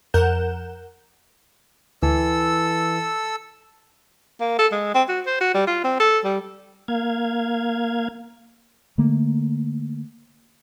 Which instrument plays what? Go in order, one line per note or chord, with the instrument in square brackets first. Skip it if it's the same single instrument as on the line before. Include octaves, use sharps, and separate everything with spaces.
[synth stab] F2 A#4 F#5 G6 E7
[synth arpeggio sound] D2 [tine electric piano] E3 [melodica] A4 E6
[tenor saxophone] A#3
A4
G#3
C4
F#4
C5
F#4
G3
F4
C4
A4
G3
[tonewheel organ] A#3 F5 G#6
[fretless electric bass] D3 A3 A#3